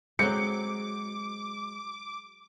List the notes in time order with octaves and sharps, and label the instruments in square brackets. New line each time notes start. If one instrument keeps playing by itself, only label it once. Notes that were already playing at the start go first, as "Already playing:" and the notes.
[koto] F#3 C4 [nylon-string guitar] G#3 [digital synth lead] D6 [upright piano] C#7